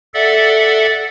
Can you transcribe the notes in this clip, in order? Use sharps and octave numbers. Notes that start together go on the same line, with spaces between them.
A4 D5 E5 F#5